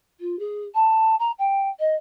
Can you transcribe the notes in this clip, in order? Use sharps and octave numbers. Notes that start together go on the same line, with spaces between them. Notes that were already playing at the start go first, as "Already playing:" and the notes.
F4
G#4
A5
A#5
G5
D#5